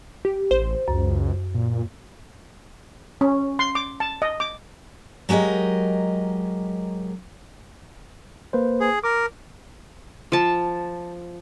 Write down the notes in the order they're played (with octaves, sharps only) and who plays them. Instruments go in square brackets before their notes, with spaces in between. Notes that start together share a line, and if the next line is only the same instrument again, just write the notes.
[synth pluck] G4
[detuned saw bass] A1 [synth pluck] C5
[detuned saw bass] C#2 [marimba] F#2
[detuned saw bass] A#2
[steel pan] C#4
C6
D6
A5
D#5
D6
[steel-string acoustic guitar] F#3 G#3 G4 A#4 D#5
[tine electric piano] A#3 B4 C5
[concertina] G#4
[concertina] A#4 [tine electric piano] D6
[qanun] F3 A5